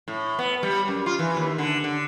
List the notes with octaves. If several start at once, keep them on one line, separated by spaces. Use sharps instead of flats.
A2
B3
G3
F#2
F4
E3
D#2
D3
D3